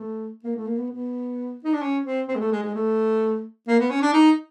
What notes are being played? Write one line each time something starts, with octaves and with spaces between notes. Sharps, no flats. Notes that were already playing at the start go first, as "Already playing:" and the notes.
Already playing: A3
A#3
A3
A#3
B3
B3
D#4
D4
C#4
C4
C4
G#3
A3
G#3
G#3
A3
A#3
B3
C#4
D4
D#4